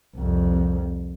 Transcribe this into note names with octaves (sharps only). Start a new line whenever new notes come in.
C2 F2